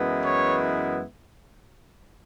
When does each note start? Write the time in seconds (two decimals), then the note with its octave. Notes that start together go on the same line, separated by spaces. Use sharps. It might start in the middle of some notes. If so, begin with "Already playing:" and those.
Already playing: F#2 E3 G#3 B3 E4
0.24 C#5